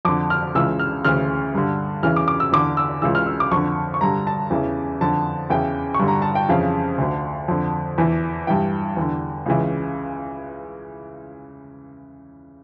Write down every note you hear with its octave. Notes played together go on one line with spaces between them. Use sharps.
F2 D3 D6
F6
C#2 C#3 E3 E6
F6
D2 C#3 E3 F6
G2 D3
E2 C#3 E3 F6
D6
D6
E6
E2 D3 D6
E6
C#2 C#3 E3 E6
F6
E6
D6
F2 D3 C#6
C#6
G2 D3 A#5
A5
E2 C#3 E3
F2 D3 A5
E2 C#3 E3 G5
C#6
G2 D3
A#5
A5
G5
F2 C#3 E3 F5
D2 D3
F2 D3
E2 E3
G2 E3 G5
E2 D3
C#2 C#3 E3